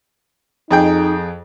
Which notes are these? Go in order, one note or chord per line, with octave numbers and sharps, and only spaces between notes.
F2 D#4 G#4 G5